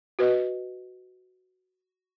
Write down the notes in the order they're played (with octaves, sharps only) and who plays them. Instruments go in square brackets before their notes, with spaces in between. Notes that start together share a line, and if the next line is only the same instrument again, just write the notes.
[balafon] F#4 B4 D#5